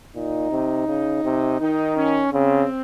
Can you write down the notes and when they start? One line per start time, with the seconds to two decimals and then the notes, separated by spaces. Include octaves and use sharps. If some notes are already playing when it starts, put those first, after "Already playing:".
0.15 A#2 D#4
0.51 C3
0.88 C#3
1.24 C3
1.60 D#3 D#4
1.97 C#4
2.33 C#3 C4